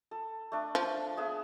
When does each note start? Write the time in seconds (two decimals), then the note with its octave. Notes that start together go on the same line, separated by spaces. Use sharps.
0.11 A4
0.52 A3 D4
0.75 F3
1.17 B3 G#4 E5